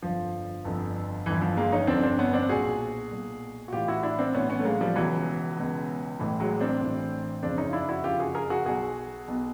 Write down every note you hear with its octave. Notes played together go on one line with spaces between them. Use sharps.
G1 F2 D3 F3
G1 F2 D3
G1 F2 D3 E3
F3
G#3 A#3
C#4 D#4
G1 F2 D3 C4 D4
C4 D4
B3 C#4
C4 D4
B1 A#2 F#4 G#4
B1 A#2
F#4
A1 A2 E3 F4 G4
E4 F#4
D4 E4
C4 D4
A1 A2 E3 B3 C#4
B3 C#4
A3
G#3 A#3
F3 G3
C#2 B2 E3 F#3
C#2 B2
A1 A2 E3
F#3 G#3
C4 D4
A1 A2 E3
F#1 F2 C#3 C4 D4
C#4 D#4
F4
D4 E4
E4 F#4
F#1 F2 C#3 F4 G4
F#4 G#4
G#4 A#4
F#4 G#4
B1 B2 F#4 G#4
B1 B2